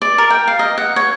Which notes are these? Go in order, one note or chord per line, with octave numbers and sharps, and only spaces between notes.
D5
A#4
G5
F5
D#5
F#5
C#5